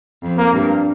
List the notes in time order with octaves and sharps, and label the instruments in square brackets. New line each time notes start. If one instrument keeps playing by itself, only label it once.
[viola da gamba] F2
[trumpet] A#3
[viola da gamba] G2